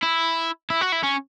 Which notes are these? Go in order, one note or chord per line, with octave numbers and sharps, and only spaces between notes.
E4
E4
F#4
E4
C#4